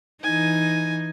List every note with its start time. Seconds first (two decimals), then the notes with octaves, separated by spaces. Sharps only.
0.23 E3 D#4 G#5